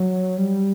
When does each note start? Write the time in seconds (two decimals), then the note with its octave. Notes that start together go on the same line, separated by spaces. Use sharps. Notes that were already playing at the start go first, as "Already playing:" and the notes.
Already playing: F#3
0.38 G3